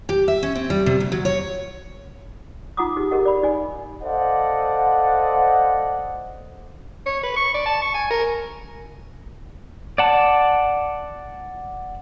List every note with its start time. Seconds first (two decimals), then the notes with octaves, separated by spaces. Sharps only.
0.09 G4
0.28 E5
0.43 C#4
0.55 C4
0.70 G3
0.86 C3
1.00 D2
1.12 F#3
1.25 C#5
2.77 D#4 F4 F#5 A#5 D6 D#6
2.96 D#4 G4 G#4
3.11 G4 G#4 A#4 D#5 F#5
3.26 D5 B5
3.43 D#4 D5 G#5
4.03 A4 C5 D5 D#5 F5 F#5
7.06 C#5
7.23 B4
7.36 C#6
7.54 D5
7.66 A5
7.82 C#6
7.94 G#5
8.10 A#4
9.98 D5 F#5 A5